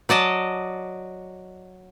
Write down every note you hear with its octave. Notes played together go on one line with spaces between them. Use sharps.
F#3 D5 D#5 A5